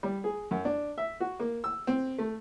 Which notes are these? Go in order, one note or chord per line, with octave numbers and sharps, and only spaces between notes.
G3
G#4
F#2
D4
E5
F#4
A#3
E6
C4
A3